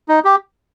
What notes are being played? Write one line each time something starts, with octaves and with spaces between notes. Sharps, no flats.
D#4
G4